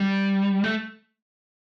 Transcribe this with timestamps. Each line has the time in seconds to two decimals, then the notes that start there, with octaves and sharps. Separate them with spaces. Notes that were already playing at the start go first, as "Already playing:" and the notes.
Already playing: G3
0.64 A3